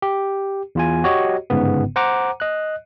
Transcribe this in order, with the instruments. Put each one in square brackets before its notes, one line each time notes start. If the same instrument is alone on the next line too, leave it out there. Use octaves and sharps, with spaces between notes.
[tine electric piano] G4
E2 F4 G#5
F#4 G4 C#5 D#5
G1 G#2 C#3 B3
C5 F#5 A#5 D6
D#5 F#6